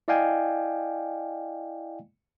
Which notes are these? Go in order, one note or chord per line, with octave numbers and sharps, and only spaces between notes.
E4 D5 D#5 F5 G5 G#5